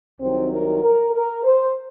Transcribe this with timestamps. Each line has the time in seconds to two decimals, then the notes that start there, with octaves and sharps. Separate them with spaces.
0.20 C2 C3 D#3 F#3 C4
0.51 A#4
0.82 A#4
1.13 A#4
1.44 C5